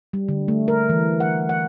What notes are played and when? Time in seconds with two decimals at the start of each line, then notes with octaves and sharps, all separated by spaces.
0.13 G3
0.29 D3
0.48 A3
0.68 A#4
0.89 E3
1.20 F#5
1.49 F#5